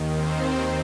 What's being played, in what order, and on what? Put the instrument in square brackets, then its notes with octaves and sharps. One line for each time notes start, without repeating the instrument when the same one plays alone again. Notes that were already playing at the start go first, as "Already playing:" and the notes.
Already playing: [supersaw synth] D#2 D#3
C4 C5